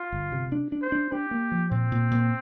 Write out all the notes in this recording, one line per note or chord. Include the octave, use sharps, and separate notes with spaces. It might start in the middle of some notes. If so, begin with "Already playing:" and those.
Already playing: F4
G1
C3
D4
D4
C5
D4
D4 G4
A#3
F3
A#2 C4
A#2
A#2